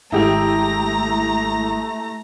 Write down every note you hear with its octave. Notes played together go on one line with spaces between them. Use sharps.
G#1 G#3 A3 E4 G4 A#5 D#6 F7